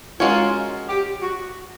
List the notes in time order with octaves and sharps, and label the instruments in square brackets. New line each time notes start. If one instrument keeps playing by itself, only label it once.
[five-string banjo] G#3 C#4 F#4 A#4 C#5 [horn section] F4
[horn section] G4
F#4